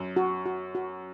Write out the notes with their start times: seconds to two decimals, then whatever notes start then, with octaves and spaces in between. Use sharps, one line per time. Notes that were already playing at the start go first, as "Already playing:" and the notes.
Already playing: F#2
0.16 F#4
0.46 F#4
0.75 F#4